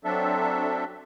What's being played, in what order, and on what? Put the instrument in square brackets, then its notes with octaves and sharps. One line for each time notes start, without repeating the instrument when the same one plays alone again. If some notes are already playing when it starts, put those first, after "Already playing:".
[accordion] F#3 C4 D4 A4 E5